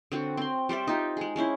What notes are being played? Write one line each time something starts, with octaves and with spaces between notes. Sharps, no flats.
D3 C4 F#4
C4 C6
G3 C5 D5 E5
D#4 F4 G4
G#3 G#4
G#3 C#4 E4 C5